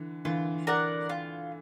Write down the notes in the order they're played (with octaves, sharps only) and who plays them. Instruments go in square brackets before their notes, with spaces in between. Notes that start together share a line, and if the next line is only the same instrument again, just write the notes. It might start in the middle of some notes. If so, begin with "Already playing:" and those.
Already playing: [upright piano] D3 E3
[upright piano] D3 E3 [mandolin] F4
[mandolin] A#4 D5 F#5
F4